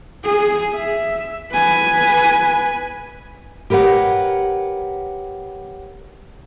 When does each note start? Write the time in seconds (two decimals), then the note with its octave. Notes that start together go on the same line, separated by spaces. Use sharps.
0.24 G#4
0.75 E5
1.53 B4 G#5
3.70 G4 A#4 B4 C#5 F#5